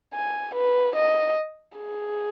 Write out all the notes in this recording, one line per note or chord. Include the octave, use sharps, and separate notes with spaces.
G#5
B4
D#5
G#4